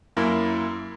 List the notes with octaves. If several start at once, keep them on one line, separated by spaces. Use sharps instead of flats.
F#2 A#3 E4